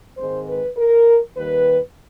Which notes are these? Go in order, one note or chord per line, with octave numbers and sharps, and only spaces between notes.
G#2 D#3 G#3 C4 C5
B4
A#4
D#2 D#3 G3 B4